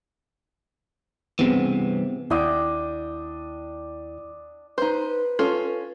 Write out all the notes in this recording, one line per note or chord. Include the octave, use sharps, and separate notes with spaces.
G2 C3 E3 B3 C4 G#4
D#2 D4 E4 D#5 G5
D#4 B4 C5
C#4 F4 A4